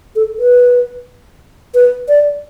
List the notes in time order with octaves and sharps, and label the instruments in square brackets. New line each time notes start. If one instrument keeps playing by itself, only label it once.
[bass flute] A4
B4
B4
D5